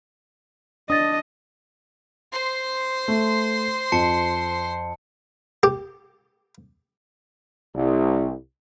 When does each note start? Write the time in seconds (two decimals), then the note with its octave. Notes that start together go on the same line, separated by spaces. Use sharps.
0.90 D4 D#5 D#6 A6
2.33 C5 C6
3.08 A3
3.92 F2 A5 C#7
5.63 G4
7.75 C2